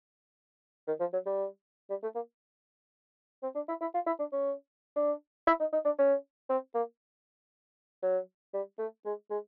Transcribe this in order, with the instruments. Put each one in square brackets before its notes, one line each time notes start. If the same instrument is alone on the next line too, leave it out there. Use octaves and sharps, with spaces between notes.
[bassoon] D#3
F3
F#3
G3
G3
A3
A#3
C4
D4
E4
E4
F4
E4
D4
C#4
D4
E4
D#4
D#4
D4
C#4
C4
A#3
F#3
G3
A3
G#3
G#3